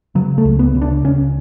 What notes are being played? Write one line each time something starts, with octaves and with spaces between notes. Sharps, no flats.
C#3 F#3
A3
C#2
B3
C#3
D4
C#2 C#4